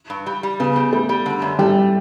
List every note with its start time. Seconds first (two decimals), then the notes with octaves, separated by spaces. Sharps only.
0.10 G2
0.26 G3
0.43 G3
0.60 C#3 B3
0.76 G3
0.93 G3 A3
1.09 G3
1.26 D3
1.42 F#2
1.59 G3 A3